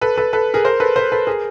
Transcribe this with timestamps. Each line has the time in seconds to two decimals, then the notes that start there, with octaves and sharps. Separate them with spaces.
0.01 A4 B4
0.17 A4 B4
0.33 A4 B4
0.54 G#4 A#4
0.65 A#4 C5
0.80 A4 B4
0.96 A#4 C5
1.12 A4 B4
1.27 G#4 A#4